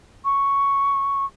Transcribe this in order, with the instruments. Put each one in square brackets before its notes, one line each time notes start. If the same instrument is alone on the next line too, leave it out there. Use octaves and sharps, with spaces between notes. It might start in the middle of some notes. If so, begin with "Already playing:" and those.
[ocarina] C#6